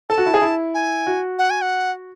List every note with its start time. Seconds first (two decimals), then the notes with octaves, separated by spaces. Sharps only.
0.09 A4 A5
0.18 F#4
0.26 E4
0.34 G#4
0.42 E4
0.74 G#5
1.06 F#4
1.39 F#5
1.50 G#5
1.62 F#5